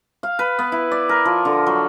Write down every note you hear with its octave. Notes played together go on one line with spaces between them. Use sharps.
F5
B4
B3
E4
D5
A#4
F3
D3
F#3